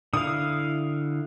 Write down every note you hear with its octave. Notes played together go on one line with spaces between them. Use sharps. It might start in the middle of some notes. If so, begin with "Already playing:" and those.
D3 E4 F5 D#6